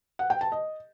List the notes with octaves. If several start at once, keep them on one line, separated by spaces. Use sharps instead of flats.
F#5
G5
A5
D#5